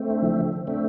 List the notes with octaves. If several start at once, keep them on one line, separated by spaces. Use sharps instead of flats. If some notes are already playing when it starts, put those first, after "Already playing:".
Already playing: A3 C4
D4
F3
D3
D3
A3 C4 D4